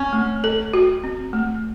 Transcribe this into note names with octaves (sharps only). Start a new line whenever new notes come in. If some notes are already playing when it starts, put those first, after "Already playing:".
Already playing: C4 C#4
A3
A4
F#4
C4
A3